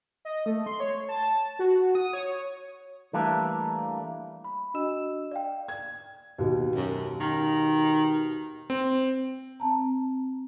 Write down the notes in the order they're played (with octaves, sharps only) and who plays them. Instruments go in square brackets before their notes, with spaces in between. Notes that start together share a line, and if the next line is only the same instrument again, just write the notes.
[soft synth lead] D#5
A3
C6
C#5
A5
F#4
D#6
C#5
[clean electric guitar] E3 G3 A3 A#3 D4
[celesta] B5
D4 F#4 D#5 E6 E7
D5 F5 G5
[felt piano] G#6
D#2 B2
[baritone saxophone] F#2
D#3
[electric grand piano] C4
[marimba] C4 A5 A#5